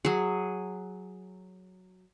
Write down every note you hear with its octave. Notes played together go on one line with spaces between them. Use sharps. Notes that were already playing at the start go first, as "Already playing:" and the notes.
F#3 G#4